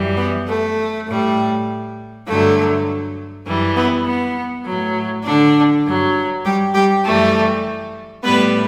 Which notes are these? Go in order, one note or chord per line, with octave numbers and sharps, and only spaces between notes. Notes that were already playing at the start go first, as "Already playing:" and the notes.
Already playing: F#2 E3 G3
B3
A3
A2 G3
G2 D3 F#3 A3
F#2 E3 G3
B3
B3
A2 F#3
D3 D4
G2 F#3
G3 G4
G3 G4
F#2 E3 G3 A3 A4
A2 G3 B3 B4